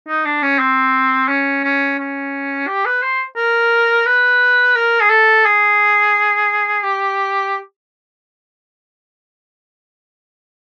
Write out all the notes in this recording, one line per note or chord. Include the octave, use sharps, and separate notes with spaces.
D#4
D4
C#4
C4
C#4
C#4
C#4
G4
B4
C5
A#4
B4
A#4
G#4
A4
G#4
G4